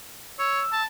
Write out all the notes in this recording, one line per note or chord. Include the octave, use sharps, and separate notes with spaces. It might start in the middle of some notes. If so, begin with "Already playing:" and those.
C#5 E6
A5